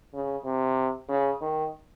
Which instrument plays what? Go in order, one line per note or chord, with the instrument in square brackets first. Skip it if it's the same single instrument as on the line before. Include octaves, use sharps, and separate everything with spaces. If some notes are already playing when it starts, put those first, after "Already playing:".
[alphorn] C#3
C3
C#3
D#3